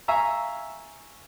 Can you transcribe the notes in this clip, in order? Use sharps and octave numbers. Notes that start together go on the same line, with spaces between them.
E5 F5 G#5 A#5 C#6 E6